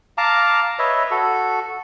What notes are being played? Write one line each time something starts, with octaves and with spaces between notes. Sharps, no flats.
F5 A5 A#5 D6
B4 C#5 D#5 E5
F#4 A4